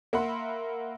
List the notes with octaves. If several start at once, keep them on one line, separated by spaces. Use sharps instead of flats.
A#3 E5 F#5 B5 C6